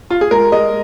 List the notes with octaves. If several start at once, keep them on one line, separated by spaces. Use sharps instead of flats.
F4
G#4
G#3 A#4
G#3 D#5